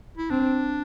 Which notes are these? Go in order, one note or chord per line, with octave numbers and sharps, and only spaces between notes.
E4
C4 D4